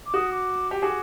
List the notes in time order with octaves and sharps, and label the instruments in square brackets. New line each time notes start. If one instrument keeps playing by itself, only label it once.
[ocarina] D6
[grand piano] F#4 [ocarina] D#6
[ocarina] D6
[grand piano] G4
[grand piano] F#4 G#4 [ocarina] D6